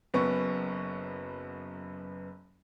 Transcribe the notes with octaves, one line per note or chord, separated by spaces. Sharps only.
F#1 F#2 B3 C#6